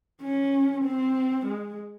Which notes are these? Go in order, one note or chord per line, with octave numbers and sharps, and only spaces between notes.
C#4
C4
G#3